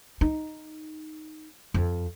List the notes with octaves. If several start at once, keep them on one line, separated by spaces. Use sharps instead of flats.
D#4
F2